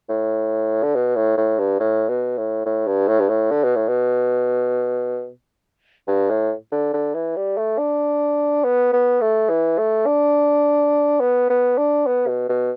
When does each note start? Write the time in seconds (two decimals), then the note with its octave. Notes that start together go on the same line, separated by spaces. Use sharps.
0.09 A2
0.83 D3
0.95 B2
1.16 A2
1.37 A2
1.59 G2
1.80 A2
2.09 B2
2.38 A2
2.66 A2
2.87 G2
3.08 A2
3.20 G2
3.29 A2
3.51 D3
3.64 B2
3.76 A2
3.88 B2
6.07 G2
6.30 A2
6.72 D3
6.94 D3
7.14 E3
7.37 G3
7.57 A3
7.78 D4
8.64 B3
8.93 B3
9.21 A3
9.49 E3
9.78 A3
10.06 D4
11.20 B3
11.50 B3
11.78 D4
12.07 B3
12.28 B2
12.49 B2